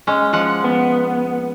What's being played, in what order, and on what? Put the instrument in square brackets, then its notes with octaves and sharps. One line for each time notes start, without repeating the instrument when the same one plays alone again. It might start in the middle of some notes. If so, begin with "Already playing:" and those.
[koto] G#3 C#4
F3 G#3 F#5
[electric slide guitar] B3